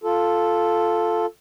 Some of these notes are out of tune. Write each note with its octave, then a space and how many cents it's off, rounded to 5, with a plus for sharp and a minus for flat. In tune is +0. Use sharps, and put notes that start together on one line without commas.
F4 +0 A4 +0